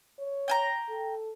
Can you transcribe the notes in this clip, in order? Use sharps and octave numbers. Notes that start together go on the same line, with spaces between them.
C#5
G5 G#5 A#5
A4